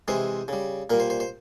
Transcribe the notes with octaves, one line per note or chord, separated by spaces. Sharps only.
C3 E3 G#3 C5
C#3 G3
A#2 G3 A#4
C5
C5
C5